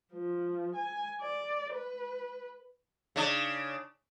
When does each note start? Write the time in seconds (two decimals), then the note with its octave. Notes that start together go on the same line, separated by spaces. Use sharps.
0.13 F3
0.76 G#5
1.22 D5
1.73 B4
3.16 C#3 D4